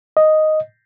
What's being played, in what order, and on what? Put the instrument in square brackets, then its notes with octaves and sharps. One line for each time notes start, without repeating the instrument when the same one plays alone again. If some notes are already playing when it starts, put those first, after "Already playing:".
[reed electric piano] D#5